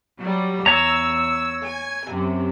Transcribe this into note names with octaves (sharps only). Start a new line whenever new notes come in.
F#3 G3
E2 C#5 A#5 E6
G#5
F#2 C3